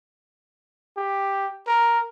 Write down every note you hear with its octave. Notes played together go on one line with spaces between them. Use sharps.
G4
A#4